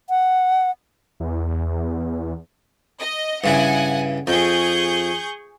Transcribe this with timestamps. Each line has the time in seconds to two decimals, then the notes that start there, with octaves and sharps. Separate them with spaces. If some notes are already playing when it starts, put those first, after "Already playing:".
0.09 F#5
1.20 E2
2.99 D#5
3.44 G2 C#3 E4 F#5 G#5
4.27 F2 G#4 C#6 G6